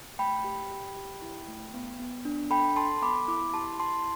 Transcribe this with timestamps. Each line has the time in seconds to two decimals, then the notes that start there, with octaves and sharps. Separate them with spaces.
0.19 A3 G5 B5
0.44 G4
0.71 G4
0.97 G4
1.22 E4
1.48 A3
1.74 B3
1.99 B3
2.25 D4
2.50 A4 G5 B5
2.76 A4 A5 C6
3.02 B3 B5 D6
3.28 E4 B5 D6
3.54 G4 A5 C6
3.80 E4 A5 C6